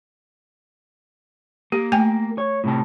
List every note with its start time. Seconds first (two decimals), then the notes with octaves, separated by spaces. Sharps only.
1.72 A#3 G4
1.92 A3 G5 G#5
2.38 C#5
2.64 A2 C3 A5